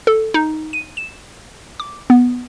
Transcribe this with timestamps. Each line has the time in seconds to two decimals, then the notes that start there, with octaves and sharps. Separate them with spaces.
0.07 A4
0.34 D#4
0.73 D#7
0.97 E7
1.80 D6
2.10 B3